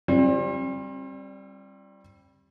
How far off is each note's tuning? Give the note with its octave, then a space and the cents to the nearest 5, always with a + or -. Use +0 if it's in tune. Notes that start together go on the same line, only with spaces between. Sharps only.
G3 +0 C4 +35 F4 -45